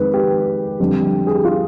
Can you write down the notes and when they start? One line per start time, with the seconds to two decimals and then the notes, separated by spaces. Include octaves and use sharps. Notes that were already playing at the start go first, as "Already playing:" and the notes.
Already playing: F2 D#3 G#3 B4
0.14 G4
0.80 F2 D3 G3
1.27 G#4
1.35 G4
1.45 F4